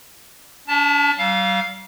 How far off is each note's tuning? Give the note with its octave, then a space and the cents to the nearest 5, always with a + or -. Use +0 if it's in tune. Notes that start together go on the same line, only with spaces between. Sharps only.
D4 -45 A5 +0
G3 -40 F5 +0